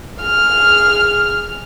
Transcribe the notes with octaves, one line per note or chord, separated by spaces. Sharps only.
G#4 F6